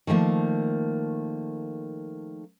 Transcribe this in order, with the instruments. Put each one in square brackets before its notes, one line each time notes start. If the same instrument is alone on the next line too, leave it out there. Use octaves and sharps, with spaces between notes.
[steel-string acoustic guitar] D#3 F3 A3 A#3